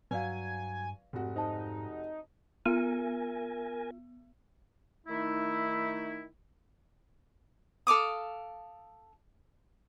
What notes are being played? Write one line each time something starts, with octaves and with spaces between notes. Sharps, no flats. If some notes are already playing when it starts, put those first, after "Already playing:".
G2 F#3 B4 D5 F5 G#5
F1 G#2 F#4
D#4 C5 A5
B3 F4 A#4 G#5
D#3 A3 D#4 E4
A4 F5 D6 D#6